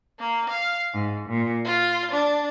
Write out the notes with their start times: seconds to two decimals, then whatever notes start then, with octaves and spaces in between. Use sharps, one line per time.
0.18 A#3
0.48 F5
0.93 G#2
1.29 A#2
1.64 F4
2.10 D4